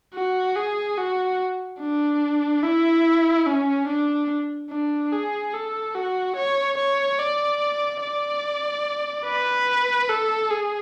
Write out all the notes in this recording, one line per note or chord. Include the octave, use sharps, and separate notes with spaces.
F#4
G#4
F#4
D4
E4
C#4
D4
D4
G#4
A4
F#4
C#5
C#5
D5
D5
B4
A4
G#4